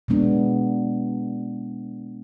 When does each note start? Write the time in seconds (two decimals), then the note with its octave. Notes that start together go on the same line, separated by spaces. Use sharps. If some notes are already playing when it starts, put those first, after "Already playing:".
0.08 B2 G#3 B3 D4